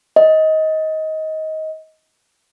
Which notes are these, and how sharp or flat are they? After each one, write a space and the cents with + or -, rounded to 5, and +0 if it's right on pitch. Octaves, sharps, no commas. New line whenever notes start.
D#5 +20